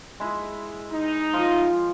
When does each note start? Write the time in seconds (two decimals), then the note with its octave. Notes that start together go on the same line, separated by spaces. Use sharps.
0.20 G#3 E4
0.92 D#4
1.33 F3